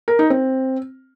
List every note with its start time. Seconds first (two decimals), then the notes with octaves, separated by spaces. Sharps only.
0.08 A#4
0.19 D#4
0.30 C4